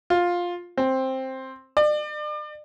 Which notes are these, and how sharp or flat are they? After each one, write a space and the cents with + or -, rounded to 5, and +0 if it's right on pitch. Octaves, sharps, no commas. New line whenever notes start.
F4 +10
C4 +10
D5 +40